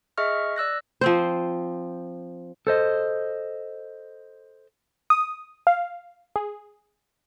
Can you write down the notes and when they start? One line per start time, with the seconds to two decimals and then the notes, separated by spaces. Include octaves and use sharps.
0.18 G#4 D#5 E5 C#6 F6
0.56 D5 E6 F#6 A#6
1.01 F3 C4 C5
2.67 A4 C5 D#5
5.10 D#6
5.67 F5
6.36 G#4